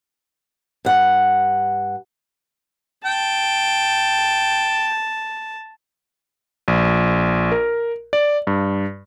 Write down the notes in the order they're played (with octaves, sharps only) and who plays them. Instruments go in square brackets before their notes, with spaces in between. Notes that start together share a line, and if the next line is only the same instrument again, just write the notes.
[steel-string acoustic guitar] G2 F#5
[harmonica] G5 [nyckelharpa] A5
[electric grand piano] A#1
A#4
D5
G2